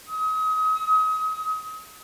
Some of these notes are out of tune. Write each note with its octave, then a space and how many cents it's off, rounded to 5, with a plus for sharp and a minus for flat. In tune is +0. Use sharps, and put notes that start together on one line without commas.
D#6 +35